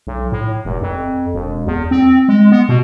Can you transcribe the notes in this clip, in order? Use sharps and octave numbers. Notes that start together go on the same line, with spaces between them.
B1
A2
F1
F2
E1
E2
C4
G#3
B3
B2